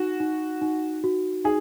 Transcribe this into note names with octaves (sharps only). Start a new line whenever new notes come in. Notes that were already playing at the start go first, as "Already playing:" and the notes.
Already playing: D#4 F#4
D#4
D#4
F#4
D#4 G#4